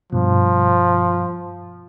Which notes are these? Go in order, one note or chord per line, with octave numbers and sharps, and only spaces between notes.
G2 B2 F3